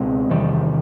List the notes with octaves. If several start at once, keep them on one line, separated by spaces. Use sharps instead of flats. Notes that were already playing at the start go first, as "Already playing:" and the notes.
Already playing: C#2 B2 G#3 C4
E2 C3 D#3 G3